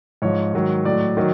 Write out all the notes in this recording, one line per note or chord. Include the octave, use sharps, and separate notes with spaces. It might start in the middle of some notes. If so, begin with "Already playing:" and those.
G#2 F3 C#5
G#2 D#3 F#3
A2 F#3 D5
D#3 F#3